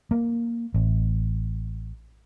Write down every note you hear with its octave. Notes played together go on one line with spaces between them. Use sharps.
A#3
A1